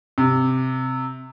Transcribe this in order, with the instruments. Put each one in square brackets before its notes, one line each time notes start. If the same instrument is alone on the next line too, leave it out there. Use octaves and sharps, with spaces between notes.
[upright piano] C3